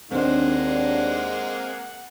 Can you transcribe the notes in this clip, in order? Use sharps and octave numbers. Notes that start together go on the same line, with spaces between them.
D#2 G#3 A#3 C4 D4 C5 F#5